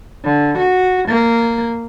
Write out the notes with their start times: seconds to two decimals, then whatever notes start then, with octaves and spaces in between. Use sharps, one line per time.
0.23 D3
0.58 F#4
1.08 A#3